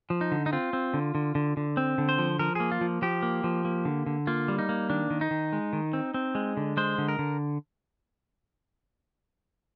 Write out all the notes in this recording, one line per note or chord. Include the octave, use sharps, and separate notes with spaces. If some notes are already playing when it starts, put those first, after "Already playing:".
F3
D#4
D3
D#4
C4 F4
C4
D3
D3
D3
D3
C4
D3
C5
F3
F3 A#4
A#3 G#4
F4
F3
F3 G4
A#3
F3
A#3
D3
D3
A#3 F4
G3
D#4
A#3
D#3 D4
D#3
D#4
D#3
G#3
D#3
C4
C4
G#3
D3
G#3 C5
D3
A#4
D3